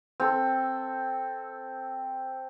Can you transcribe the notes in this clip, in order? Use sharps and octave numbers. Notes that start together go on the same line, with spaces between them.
C4 A4